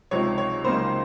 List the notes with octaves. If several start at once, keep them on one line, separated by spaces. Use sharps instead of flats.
C#2 C3 F3 C4 D#4 C#5
C#5
C#2 C#3 F#3 A#3 D#4 C5